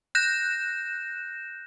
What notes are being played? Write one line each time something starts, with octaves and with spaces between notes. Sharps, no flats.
F#6 G6 A#6 E7